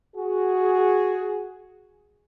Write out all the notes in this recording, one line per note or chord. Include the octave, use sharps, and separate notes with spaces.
F#4 G#4